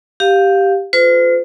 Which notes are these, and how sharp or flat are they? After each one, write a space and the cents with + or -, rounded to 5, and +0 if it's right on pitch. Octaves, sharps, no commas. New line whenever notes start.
G4 +0 F5 +10
F4 +10 A4 +0 C5 -45